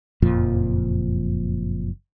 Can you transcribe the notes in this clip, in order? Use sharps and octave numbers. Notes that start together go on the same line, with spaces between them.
F#1 F2 A#2 F3